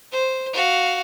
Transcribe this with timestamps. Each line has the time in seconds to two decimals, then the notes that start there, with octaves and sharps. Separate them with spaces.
0.12 C5
0.53 F#4 F5